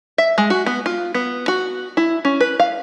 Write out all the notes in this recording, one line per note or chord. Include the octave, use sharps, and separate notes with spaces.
E5
G#3
F#4
B3
F4
B3
F#4
E4
C#4
B4
F5